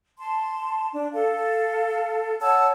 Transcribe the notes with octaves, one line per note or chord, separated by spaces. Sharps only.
A5 C6
D4
A4 F5
C#5 F#5 A5 E6